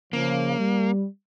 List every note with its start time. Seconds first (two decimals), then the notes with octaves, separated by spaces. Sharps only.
0.13 C#3 F3 A#3
0.58 G3